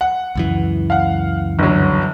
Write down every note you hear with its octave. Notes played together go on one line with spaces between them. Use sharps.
F#5
C#2 F#2 E3
F5 F#5
G1 F#3